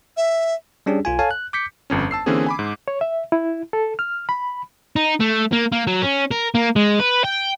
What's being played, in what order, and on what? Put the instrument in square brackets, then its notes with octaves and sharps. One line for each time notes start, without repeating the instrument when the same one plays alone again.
[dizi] E5
[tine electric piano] G3 C#4 D4 G4 G#4
B1 F4 G#5
A4 C#5 F5 G#5 A5
F#6
D6 G6 B6 C#7
[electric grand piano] G1 F2 C#4
A5 E6 C7
D3 E3 A#3 C4 C#4 G#4
G#5 B5 D6
G#2
[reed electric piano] C#5
E5
E4
A4
F6
B5
[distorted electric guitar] D#4
A3
A#3
A#3
F#3
C#4
A#4
A#3
G#3
B4
G5